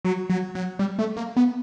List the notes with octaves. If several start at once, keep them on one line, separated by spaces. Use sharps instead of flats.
F#3
F#3
F#3
G3
A3
A#3
B3